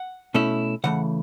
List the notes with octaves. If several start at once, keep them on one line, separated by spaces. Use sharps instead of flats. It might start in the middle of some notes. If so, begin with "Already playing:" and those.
Already playing: F#5
B2 A3 C#4 E4
C#3 E3 A3 F#5